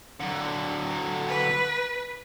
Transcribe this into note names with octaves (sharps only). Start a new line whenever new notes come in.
D3 F#3
B4